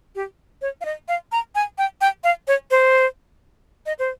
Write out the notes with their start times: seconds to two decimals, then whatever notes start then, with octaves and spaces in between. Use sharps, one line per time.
0.15 G4
0.62 C#5
0.81 F5
0.85 D#5
1.08 F5
1.32 A#5
1.55 G#5
1.78 G5
2.01 G5
2.24 F5
2.48 C#5
2.71 C5
3.86 D#5
3.99 C5